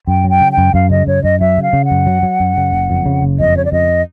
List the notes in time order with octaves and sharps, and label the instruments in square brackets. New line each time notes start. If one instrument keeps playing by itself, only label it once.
[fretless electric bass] F#2 [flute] G5
[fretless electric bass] F#3
[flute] G5
[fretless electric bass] C#3
[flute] G5
[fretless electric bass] F#2
[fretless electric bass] F#2 [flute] F5
[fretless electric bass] C#3 [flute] D#5
[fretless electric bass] F#2 [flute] C#5
[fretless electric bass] F#2 [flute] D#5
[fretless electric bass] F#3 [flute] E5
[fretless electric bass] C#3
[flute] F5
[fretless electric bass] C#3
[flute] F#5
[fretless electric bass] F#2
F#3
F#3
F#2
C#3
F#1
F2
C#3
F#1
[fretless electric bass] F2 [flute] D#5
[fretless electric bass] C#3 [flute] C#5
[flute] D5
[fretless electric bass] F2 [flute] D#5